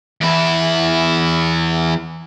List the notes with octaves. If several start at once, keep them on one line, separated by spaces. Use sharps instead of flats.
E2 E4